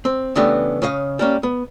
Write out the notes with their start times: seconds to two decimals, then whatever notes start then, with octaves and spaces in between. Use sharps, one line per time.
0.05 C4
0.36 C#3 E3 A3 B3 D4 G4
0.82 C#3 C#5 D#5 F5
1.19 G3 A#3 C#4
1.43 B3